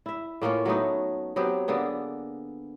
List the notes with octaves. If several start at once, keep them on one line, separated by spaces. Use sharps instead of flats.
E4 E5
A2 A#3 C#4 F4
F#3 A3 B3 D#4
F#3 B3 C4 G4
D3 A#3 B3 G#4